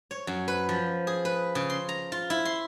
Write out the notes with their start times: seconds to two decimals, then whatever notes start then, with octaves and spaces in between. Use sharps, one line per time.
0.11 C#5
0.27 F#2
0.48 B4
0.69 F3
1.07 G#4
1.25 B4
1.55 C#3
1.70 C6
1.89 A#5
2.12 F4
2.30 E4
2.45 C6